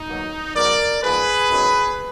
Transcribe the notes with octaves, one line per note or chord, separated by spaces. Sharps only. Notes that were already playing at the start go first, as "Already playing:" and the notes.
Already playing: D#4
B2 F#3 A#3
G#2 F#3 B3 A#4 D5
G#2 F3 B3 G#4 B4
F#2 D#3 F#3 B3